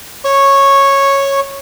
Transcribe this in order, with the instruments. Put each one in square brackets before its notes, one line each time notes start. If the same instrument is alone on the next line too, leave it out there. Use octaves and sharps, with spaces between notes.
[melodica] C#5 C#6